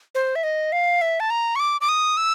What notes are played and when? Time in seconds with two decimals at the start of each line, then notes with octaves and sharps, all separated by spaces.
0.15 C5
0.36 E5
0.43 D#5
0.72 F5
1.01 E5
1.20 A5
1.30 A#5
1.56 C#6
1.60 D6
1.81 D6
1.89 D#6
2.17 E6